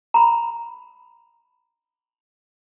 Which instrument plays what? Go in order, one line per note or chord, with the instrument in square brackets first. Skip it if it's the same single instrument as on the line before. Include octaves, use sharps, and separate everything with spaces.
[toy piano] A#5 B5